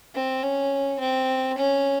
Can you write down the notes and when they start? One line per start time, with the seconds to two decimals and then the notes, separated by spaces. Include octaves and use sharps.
0.15 C4
0.43 C#4
1.00 C4
1.58 C#4